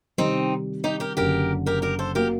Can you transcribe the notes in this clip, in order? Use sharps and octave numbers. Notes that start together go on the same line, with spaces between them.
C3 D#3 G3 C4 D#4
D#4 G4
G4 A#4
F#1 F#2 D3 G4 A#4
G4 A#4
G4 A#4
A4 C5
F#3 A#3 G4 A#4